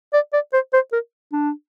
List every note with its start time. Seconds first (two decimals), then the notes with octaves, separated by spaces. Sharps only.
0.13 D5
0.33 D5
0.53 C5
0.73 C5
0.92 A#4
1.32 D4